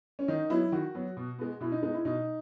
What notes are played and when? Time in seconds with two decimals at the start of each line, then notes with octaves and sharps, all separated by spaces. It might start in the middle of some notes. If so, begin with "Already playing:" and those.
0.19 C#4
0.28 D#3 D#4
0.50 F#3 B3 E4
0.72 D#3 F#4
0.95 F#3 B3
1.17 B2
1.39 G#3 B3
1.61 B2 E4
1.72 D#4
1.83 G#3 B3 D#4
1.94 E4
2.05 B2 D#4